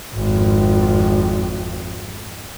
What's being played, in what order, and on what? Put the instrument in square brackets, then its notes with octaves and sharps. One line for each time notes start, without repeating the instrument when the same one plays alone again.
[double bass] G#1 F2